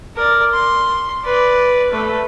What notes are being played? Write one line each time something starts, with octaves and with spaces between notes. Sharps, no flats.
A#4 D5
C6
B4 D5
A3 B4